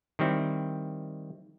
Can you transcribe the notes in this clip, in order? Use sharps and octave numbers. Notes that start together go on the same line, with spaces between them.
D#3 G3 C4 E4